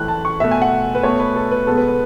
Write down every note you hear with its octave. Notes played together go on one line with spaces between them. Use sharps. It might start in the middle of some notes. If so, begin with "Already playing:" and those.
Already playing: A2 E3 A3 F#6
A5
C#6
B2 A3 E5
G#5
F#5
B4
B2 A3 C#5
B4
A4
B4
B2 G#3 B3 A4
B4
B4